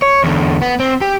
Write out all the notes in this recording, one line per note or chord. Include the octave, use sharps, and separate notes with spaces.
C#5
E2 D3
B3
C4
G4